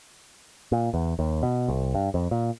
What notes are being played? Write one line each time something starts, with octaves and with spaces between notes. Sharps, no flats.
A#2
E2
D#2
B2
C2
G2
F2
A#2